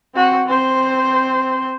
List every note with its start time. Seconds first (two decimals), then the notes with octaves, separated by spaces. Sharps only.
0.14 C4 F#4
0.47 C4 C5